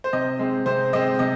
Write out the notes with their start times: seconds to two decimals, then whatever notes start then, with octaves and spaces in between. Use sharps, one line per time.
0.04 C5
0.13 C3 D#5
0.39 G#3 C4
0.66 C3 C5
0.93 G#3 C4 D#5
1.19 C3 D#5